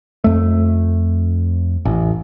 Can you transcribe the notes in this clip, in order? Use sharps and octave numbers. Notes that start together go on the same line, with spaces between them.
F2 A3
A1